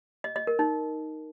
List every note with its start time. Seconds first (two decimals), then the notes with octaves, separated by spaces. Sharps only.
0.24 D#5
0.36 D#5
0.47 A#4
0.59 D#4